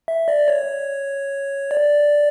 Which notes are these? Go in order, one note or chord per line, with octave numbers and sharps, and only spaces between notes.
E5
D5
C#5
D5